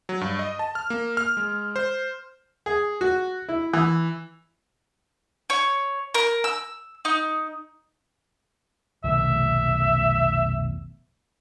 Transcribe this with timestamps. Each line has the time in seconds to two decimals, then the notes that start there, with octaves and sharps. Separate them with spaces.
0.09 F#3
0.21 G2
0.39 D#5
0.59 A5
0.75 F6
0.90 A#3
1.17 F6
1.37 G#3
1.76 C5
2.66 G#4
3.01 F#4
3.49 E4
3.73 E3
5.50 C#5
6.14 A#4
6.44 E6
7.05 D#4
9.04 F1 B1 D#3 E5